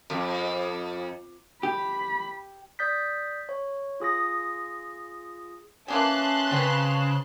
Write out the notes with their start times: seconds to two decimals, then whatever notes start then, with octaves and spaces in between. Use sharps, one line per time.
0.10 F2
1.63 G4 B5
2.79 D5 D#6 G6 A6 B6
3.49 C#5
4.00 F4 G#4 D#6 A#6
5.88 E3 A#3 C#4 G#4 A5 C6 F#6
6.52 C#3 C4 B4